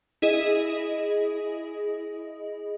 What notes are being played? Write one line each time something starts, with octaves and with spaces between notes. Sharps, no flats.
E4 G#4 D#5